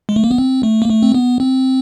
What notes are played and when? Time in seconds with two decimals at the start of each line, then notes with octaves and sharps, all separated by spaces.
0.09 G#3
0.16 A3
0.24 A#3
0.31 B3
0.38 C4
0.63 A3
0.82 A#3
0.89 A3
1.03 C4
1.14 B3
1.40 C4